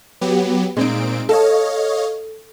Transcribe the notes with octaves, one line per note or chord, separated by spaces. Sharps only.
F#3 B3 G4
A#2 G#3 C4 D#4 D7
A4 C#5 D#5 F5